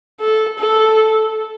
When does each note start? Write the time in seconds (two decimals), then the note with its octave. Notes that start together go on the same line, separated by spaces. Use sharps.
0.20 A4
0.59 A4